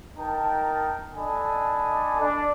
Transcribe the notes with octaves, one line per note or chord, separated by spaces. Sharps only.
D#4 A#4 G5 A5
D4 A4 D#5 G#5 A5 B5
D4